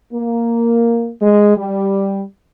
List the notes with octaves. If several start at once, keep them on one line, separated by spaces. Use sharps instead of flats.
A#3
G#3
G3